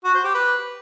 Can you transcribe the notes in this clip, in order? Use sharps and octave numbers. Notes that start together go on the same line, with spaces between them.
F#4
C5
G4
B4